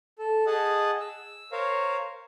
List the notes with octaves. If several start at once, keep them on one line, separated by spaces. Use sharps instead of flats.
A4
G#4 D#5 F#5 A5
E6
A#4 C5 C#5 F5